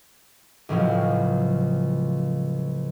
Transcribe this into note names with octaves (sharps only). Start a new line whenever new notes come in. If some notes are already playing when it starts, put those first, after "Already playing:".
C#2 A2 F3 F#3